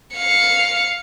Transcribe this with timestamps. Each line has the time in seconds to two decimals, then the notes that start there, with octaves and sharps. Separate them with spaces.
0.16 F5 C#7